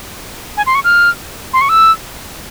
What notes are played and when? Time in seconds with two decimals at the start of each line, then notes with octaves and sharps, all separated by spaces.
0.57 G#5
0.66 C6
0.75 C#6
0.84 F6
1.53 C6
1.61 C#6
1.69 E6